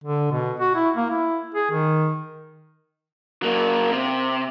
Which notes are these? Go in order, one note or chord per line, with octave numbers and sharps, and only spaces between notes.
D3
B2
F#4
E4
A#3
E4
G#4
D#3
F#3 A#3
C3